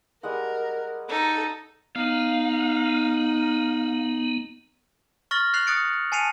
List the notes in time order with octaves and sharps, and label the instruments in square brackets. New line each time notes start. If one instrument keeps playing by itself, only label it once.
[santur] G3 G#3 F#5 [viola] A#4
[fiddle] D#4 [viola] A4
[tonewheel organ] B3 [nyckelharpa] D#4 [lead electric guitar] F5
[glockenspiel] C#6 F6 A6 A#6 F#7
F#6 A6 C7 F7 F#7
D#6 F#6 A6 C#7 D7
G#5 A5 C7 C#7 D#7 F7